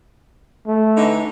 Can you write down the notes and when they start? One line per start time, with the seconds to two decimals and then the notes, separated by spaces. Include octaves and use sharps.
0.67 A3
0.97 D3 E3 D#4